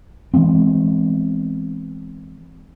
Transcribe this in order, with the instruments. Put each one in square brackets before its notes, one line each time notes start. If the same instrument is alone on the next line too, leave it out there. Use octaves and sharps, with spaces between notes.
[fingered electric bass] E3 G#3 B3 C4